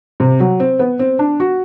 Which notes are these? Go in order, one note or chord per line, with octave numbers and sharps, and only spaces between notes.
C3
F#3
C4
B3
C4
D4
F#4